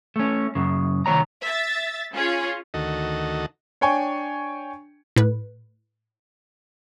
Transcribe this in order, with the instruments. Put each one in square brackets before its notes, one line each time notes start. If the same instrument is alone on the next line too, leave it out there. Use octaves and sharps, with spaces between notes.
[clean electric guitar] A3 C#4
F#2 C#3
C2 D#3 A#3 C#5 A#5
[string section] E5 A6
C#4 F4 G#4 C#5
[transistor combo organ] D2 D#3 F#4 A4 D#5
[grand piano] D4 C#5 G5 G#5 C#6
[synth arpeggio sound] A2 B4